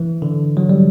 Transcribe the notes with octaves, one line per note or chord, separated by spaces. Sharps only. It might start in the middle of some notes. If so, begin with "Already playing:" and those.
Already playing: E3
D3
F#3
G3